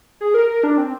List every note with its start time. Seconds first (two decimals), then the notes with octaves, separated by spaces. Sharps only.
0.21 G#4
0.34 A#4
0.49 A#4
0.64 D4
0.78 C4